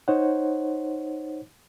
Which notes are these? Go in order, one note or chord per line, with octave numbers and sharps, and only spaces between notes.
D#4 C5 C#5 F#5